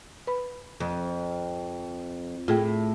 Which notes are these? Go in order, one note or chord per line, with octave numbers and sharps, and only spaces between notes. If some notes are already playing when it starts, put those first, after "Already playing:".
B4 B5
F2
A2 F4 G#4 G5